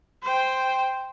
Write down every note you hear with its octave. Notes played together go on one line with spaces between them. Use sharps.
C5 G5